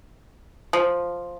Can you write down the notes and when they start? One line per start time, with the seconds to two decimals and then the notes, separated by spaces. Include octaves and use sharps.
0.73 F3